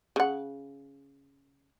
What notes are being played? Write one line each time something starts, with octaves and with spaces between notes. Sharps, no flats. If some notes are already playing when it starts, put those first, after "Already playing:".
C#3 F#5